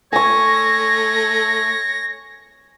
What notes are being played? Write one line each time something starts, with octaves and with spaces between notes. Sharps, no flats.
A3 C#5 G#5 C#6 A#6